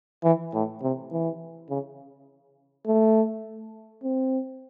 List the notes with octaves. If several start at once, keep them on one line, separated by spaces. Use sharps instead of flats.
E3
A2
C3
E3
C#3
A3
C4